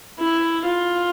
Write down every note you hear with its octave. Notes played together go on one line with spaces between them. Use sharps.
E4
F4